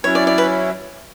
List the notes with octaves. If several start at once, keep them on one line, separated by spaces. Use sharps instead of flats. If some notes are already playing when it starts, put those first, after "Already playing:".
F#3 C#4 E4 C#5
D5
D5
B4